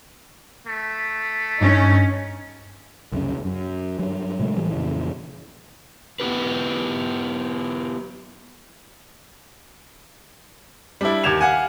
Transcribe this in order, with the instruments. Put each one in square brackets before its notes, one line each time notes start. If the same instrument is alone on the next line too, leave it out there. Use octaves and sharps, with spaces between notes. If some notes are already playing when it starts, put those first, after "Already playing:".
[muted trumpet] A3
[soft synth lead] G2 [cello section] C#4 D#4
[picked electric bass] C2 F#2 C#3
F#2
G2 F#3
A#2 C#3 G#3 A3
A2 E3 G3
F2 A#2 C#3 E3
[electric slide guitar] B3 E4 G4 B4
[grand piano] G3 D4 E4
D#2 G4 G#6 E7 F7
F5 F#5 G#5